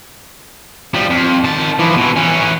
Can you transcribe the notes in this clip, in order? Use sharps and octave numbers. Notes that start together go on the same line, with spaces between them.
F3 G3
F2
D#3 A5
E3 F3
B2 E3
E3 C#4